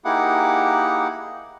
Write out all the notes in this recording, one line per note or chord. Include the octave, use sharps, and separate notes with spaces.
A#3 D#4 E4 G4 G#4 F#5